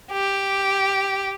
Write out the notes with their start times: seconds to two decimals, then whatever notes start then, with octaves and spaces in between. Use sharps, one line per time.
0.12 G4